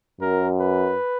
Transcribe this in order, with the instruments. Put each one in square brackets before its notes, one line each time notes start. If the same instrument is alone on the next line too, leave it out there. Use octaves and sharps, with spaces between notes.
[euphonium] F#2 [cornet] A#4
[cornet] B4